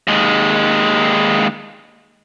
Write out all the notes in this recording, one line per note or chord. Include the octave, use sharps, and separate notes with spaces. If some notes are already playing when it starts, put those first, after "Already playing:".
D#2 G#3